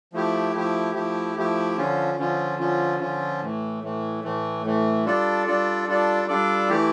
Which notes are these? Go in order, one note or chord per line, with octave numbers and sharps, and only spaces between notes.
F3 A3 E4 G4
F3 A3 E4 G4
F3 A3 E4 G4
F3 A3 E4 G4
D3 F3 C#4 F4
D3 F3 C#4 F4
D3 F3 C#4 F4
D3 F3 C#4 F4
A2 E3 A3
A2 E3 A3
A2 E3 A3
A2 E3 A3
G3 D4 F4 A4 D5
G3 D4 F4 A4 D5
G3 D4 F4 A4 D5
G3 D4 F4 A4 D5
E3 A3 E4 G4